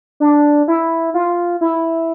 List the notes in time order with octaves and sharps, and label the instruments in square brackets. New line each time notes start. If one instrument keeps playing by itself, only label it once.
[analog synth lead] D4
E4
F4
E4